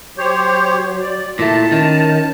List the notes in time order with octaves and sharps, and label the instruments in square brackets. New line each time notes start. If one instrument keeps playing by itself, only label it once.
[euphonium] F#3 [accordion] G4 C5 C#5
[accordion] D5
[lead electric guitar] A#2 A3 [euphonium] E4 [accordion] A5
[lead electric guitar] D#3 [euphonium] C#4